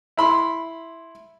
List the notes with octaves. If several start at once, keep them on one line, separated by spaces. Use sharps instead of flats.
E4 B5 C6